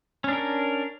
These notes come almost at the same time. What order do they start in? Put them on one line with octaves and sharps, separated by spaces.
C#4 D4 A#4